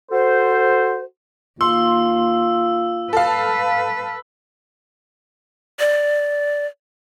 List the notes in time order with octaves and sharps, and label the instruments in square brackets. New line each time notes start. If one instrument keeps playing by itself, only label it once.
[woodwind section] F#4 A4 C5
[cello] D#2 [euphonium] F4 [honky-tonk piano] C6 [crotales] E6
[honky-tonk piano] A4 F5 [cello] B4
[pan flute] D5